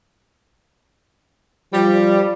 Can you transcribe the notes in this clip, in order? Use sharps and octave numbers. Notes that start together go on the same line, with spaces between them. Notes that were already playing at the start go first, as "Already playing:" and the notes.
F3 G3